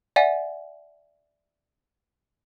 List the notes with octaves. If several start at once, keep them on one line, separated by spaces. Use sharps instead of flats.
D5 E5 F#5 G#5